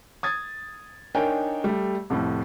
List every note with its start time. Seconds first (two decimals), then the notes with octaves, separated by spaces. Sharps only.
0.23 D#6 G#6 A6
1.15 D4 D#4 A#4 C#5 G5 G#5
1.64 G3 A3 G4
2.10 C2 F2 A2